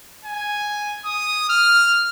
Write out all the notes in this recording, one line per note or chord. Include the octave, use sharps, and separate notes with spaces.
G#5
D#6
F6